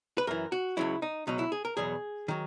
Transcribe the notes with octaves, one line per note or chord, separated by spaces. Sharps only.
B4
F#2 E3 A#4
F#4
C#2 C#3 F#3 E4
D#4
C#2 B2 F#3 D#4
E4
G#4
A#4
E2 B2 F#3 G#4
D#3 F#3